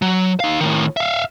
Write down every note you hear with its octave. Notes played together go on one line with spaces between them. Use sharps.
F#3
D#4 F5
A2 D#3
E5 F5